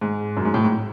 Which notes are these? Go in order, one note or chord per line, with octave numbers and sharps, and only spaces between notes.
G#2
F#2
G#2
A2
G#2